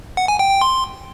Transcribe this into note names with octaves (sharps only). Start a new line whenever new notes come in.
F#5
G#5
G5
G5
C6